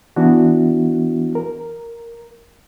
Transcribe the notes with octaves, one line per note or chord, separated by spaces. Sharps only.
E3 B3 D4 E4 F#4
A#4